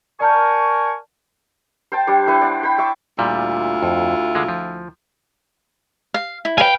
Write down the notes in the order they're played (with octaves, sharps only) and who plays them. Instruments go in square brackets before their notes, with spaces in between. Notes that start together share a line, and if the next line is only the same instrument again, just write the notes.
[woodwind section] A#4 G#5 C#6 [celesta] D5 A5 G6
[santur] C5 G5 A5
G3 D4 C5
D4 E4 B4 C5
D5 F#5
C5 G5 B5
E5 C#6 D6
[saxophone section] D2 E4 F4 [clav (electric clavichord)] A#2 G3
[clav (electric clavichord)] F2
D3 G#3
F3
[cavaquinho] F5
E4
[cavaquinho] B4 F5 [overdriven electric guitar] G5 G#5